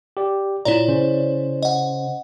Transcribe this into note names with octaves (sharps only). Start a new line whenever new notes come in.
G4 D5
A#2 E4 F4 C#5 D5 A#5
C#3 C#4 C5
D#5 F#5